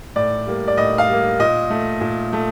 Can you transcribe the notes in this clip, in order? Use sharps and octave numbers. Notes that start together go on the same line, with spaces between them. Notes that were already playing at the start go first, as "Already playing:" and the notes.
A2 D5
G3 A#3
D5
A2 D#5
F5
G3 A#3
A#2 D#5
A3
A#2
A3